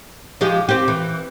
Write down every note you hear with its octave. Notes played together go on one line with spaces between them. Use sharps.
F3 G#3 G4
C4 G4
E3